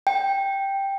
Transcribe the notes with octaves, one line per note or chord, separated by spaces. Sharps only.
G5